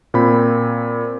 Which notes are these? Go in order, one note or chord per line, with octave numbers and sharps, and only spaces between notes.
A#2 C4 B5